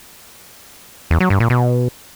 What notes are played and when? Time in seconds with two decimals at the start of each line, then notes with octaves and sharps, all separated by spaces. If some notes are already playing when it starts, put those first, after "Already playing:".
1.11 E2
1.20 F#3
1.30 G2
1.40 A#2
1.50 B2